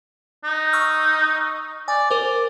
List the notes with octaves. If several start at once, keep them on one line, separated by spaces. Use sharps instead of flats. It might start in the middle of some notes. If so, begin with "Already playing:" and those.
D#4
C#6 E6 F6
D5 G#5
A#4 C5 D6